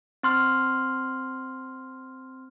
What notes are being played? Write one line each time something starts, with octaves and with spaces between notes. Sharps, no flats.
C4 C6 F6